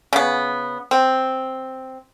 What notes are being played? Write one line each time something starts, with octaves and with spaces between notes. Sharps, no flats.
C#3 B3
C4